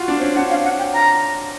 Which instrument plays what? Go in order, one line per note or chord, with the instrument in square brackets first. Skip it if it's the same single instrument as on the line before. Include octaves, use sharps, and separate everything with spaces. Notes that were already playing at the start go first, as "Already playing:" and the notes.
Already playing: [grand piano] F4 F#4
D4
C4
C#4
[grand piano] D4 [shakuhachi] F#5
[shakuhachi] F5
F#5
G5
A#5